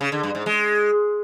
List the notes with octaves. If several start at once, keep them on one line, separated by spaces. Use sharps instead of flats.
C#3
D3
G2
G#2
G#3